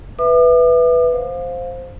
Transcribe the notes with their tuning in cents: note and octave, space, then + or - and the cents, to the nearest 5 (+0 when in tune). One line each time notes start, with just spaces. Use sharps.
B4 +0 E5 +0 D6 +45
C5 +0 F5 +15